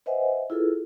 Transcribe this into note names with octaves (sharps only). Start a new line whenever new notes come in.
B4 C5 D#5 E5 F#5 G#5
E4 F4 G#4 A4 B4